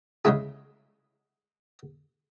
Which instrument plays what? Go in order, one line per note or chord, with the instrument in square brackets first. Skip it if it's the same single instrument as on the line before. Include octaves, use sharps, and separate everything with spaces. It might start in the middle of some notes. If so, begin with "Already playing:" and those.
[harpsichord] C#3 G#3 E4 G#4